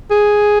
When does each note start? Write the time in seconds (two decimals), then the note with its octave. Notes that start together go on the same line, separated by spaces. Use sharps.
0.11 G#4